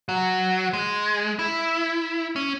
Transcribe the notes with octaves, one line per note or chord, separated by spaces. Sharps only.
F#3
G#3
E4
C#4